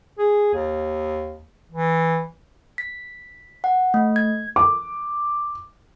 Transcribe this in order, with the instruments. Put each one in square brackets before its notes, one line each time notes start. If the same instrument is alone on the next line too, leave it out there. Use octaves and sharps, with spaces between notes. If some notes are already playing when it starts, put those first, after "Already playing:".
[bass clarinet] G#4
D#2
E3
[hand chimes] B6
F#5
A3
G#6
[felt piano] D6